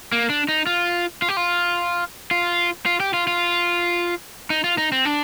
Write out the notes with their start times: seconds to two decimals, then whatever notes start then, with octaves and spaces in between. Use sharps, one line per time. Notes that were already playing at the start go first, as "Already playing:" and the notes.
0.12 A#3
0.30 D4
0.48 D#4
0.66 F4
1.22 F4
1.28 G4
1.37 F4
2.31 F4
2.86 F4
3.00 G4
3.14 F4
3.27 F4
4.50 D#4
4.64 F4
4.78 D#4
4.92 C4
5.05 D4